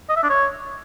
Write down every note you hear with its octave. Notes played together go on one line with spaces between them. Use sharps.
D#5
E5
D4
C#5